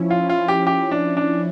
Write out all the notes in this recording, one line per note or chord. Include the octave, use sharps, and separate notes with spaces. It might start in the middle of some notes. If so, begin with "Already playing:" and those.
Already playing: F3 C#4 E4
F4
F4
G4
G4
D4
D4